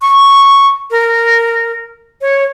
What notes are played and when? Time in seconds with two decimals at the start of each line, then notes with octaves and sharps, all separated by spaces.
0.02 C#6
0.91 A#4
2.21 C#5